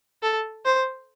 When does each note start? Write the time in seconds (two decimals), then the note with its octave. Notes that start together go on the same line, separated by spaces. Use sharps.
0.22 A4
0.65 C5